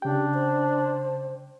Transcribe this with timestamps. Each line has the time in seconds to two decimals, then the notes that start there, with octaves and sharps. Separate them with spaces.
0.02 C#3 D4 G4 G5
0.34 C5